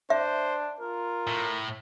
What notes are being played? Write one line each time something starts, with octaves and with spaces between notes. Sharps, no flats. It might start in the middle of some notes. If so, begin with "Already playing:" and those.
D4 C5 E5
F4 A#4
A2